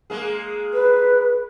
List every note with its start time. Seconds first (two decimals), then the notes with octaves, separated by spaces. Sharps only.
0.10 G#3 A#3 G#4
0.74 B4